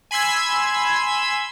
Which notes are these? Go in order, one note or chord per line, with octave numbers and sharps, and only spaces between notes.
G#5 B5 C6 E6 G#6